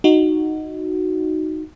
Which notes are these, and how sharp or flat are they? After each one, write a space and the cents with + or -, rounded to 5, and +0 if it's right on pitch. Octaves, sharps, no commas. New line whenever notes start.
D#4 +0 F#4 +0